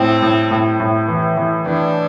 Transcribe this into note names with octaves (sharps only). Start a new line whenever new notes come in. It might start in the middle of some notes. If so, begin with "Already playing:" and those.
Already playing: A2 C4
A2
A2
A2
E3
E3
E3 D4